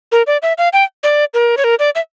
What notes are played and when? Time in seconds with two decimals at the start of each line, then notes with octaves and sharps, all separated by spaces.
0.12 A#4
0.27 D5
0.42 E5
0.58 F5
0.73 G5
1.03 D5
1.34 A#4
1.57 C#5
1.64 A#4
1.79 D5
1.95 E5